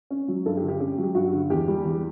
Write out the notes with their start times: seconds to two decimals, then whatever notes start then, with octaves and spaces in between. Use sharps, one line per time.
0.11 C#4
0.28 F#3
0.46 G2 A4
0.57 G4
0.62 D3
0.68 G4
0.80 C#4 G4
0.98 F#3
1.03 G4
1.15 G2 F#4
1.33 D3
1.50 E2 G4
1.68 G3
1.85 E2